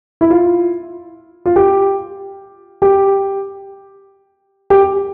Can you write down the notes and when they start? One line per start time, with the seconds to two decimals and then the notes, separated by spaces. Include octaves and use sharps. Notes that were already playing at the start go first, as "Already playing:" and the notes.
0.21 E4
0.30 F4
1.46 F4
1.56 G4
2.82 G4
4.70 G4